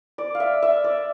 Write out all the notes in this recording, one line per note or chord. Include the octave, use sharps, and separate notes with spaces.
D5
F5
E5
E5
D5